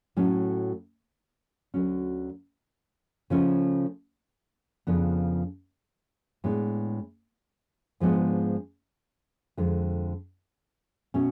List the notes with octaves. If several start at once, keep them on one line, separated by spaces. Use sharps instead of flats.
A2 F#3 A3 C#4
D2 D3 F#3 C#4
C#3 F3 A3 C#4
F2 C#3 F3 B3 D4
A2 G#3 B3 D4
G#2 F3 G#3 B3 D4
F2 D3 G#3
B2 A3 C#4